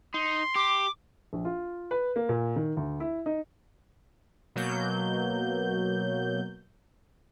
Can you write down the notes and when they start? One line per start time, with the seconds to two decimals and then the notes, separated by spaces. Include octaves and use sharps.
0.14 D#4 C6
0.55 G4 D6
1.33 A#1
1.45 F4
1.91 B4
2.16 A#3
2.29 A#2
2.56 D#3
2.77 D2
3.00 E4
3.26 D#4
4.56 B2 F#3 A#3 G6